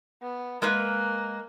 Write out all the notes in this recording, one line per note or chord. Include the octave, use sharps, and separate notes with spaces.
B3
G#3 A#3 A#4 B4